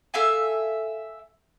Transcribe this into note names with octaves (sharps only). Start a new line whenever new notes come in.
A4 E5 F5 G#5